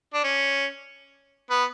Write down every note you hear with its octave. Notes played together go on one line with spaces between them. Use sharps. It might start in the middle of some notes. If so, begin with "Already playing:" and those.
D4
C#4
B3